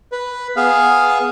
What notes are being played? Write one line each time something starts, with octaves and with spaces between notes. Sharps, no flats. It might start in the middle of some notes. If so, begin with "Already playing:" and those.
B4
B3 G#4 F5